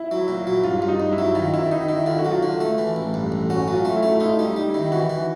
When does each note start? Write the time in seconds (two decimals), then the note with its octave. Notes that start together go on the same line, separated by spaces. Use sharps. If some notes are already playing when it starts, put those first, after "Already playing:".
Already playing: E4
0.11 F#3
0.28 A#2
0.47 F#3
0.64 G2 F4
0.82 G2
0.88 D#4
1.00 G2
1.12 E4
1.18 F#3
1.35 D#3 F4
1.54 D#3 E4
1.72 D#3 D#4
1.89 D#3 E4
2.06 D3 F4
2.19 F#4
2.25 F#3
2.31 F4
2.43 D3
2.60 A3
2.78 E3
2.96 A1
3.14 G2
3.32 A1
3.50 C#4 F#4
3.68 F#3
3.73 F4
3.85 A3
3.96 E4
4.03 A3
4.16 E4
4.20 D#4 F4
4.39 G3
4.44 D#4
4.56 G3
4.69 E4
4.74 D#3
4.92 E3 F#4
5.10 E3